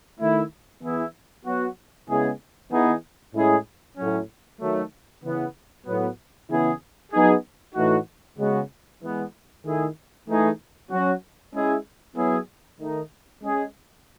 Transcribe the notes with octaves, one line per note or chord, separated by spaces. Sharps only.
D#3 A3 E4
E3 B3 E4 G#4
F#3 B3 F#4
C#3 G#3 B3 E4 G#4
E3 B3 D#4 G#4
A2 G#3 C#4 E4 G#4
A2 F#3 C#4
D#3 F#3 A3
C#3 E3 B3
A2 F#3 B3
C#3 E3 B3 E4 G#4
F#3 B3 D#4 G#4
A2 E3 A3 D#4 F#4
C#3 G#3 B3 F#4
E3 G#3 B3
D#3 A3 E4 G#4
E3 A3 D#4 G#4
F#3 C#4 F#4
G#3 C#4 E4 G#4
F#3 B3 E4 G#4
D#3 A3 D#4
G#3 C#4 G#4